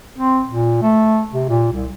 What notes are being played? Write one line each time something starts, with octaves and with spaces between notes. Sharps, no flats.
C4
A#2
A3
C3
A#2
C2